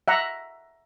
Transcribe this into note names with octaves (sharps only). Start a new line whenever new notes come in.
E5 F#5 A#5